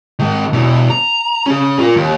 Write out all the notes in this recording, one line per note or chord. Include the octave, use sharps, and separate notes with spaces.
D#3 G#3
B2 E3
A#5
C#4 G#4
F4 A#4
D#2